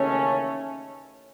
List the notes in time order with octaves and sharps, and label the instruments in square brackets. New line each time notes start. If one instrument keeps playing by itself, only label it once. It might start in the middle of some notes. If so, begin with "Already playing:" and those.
Already playing: [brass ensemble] D#2 C#3 E3 A3 C#4